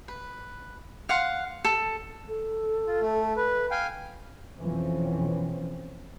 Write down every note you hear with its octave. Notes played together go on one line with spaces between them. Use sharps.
B4
F5 F#5 C6
A4
A4
F4
A3
B4
F5 G5 G#5
F2 B2 E3 F3 C4 C#4